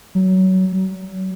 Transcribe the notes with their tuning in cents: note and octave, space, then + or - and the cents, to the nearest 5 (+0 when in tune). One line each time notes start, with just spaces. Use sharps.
F#3 +20
F#3 +40